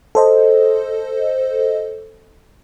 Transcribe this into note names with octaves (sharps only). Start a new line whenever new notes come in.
A4 C5 D#5